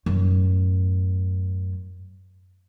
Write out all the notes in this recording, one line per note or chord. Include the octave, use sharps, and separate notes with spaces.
F#2 A2